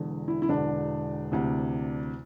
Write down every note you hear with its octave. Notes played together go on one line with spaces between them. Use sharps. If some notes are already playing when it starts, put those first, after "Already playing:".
Already playing: E1 E2 D3
E4
E4
E1 E2 D3 D4
D2 C3 E3